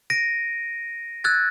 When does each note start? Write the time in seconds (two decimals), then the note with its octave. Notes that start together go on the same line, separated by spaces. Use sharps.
0.10 A#6 D7 D#7
1.24 E6 F#6 G#6 A6